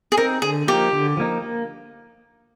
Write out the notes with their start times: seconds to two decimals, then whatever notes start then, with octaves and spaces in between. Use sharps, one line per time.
0.12 G#4
0.17 C4 D#4 A#4
0.42 D3 G#4
0.67 F3 A#3 D#4 G4
0.92 D3
1.17 F3 A#3 D#4
1.42 A#3